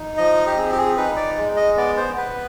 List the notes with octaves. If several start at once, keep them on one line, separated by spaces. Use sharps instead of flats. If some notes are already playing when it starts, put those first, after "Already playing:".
Already playing: D#4
F3 D#5
G4
C4 G#4
G4
G#4
D#4 B4
D5
G#3
D#5
B3 D5
C5
B3 B4